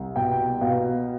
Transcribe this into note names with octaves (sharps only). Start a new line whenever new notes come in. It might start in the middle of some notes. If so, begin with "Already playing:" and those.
Already playing: C2
B2 G5
B2 F5